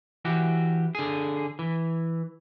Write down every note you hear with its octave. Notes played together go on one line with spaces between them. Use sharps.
E3 F#4 G4
D3 G#4
E3